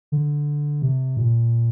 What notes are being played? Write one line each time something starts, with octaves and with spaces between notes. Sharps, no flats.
D3
C3
A#2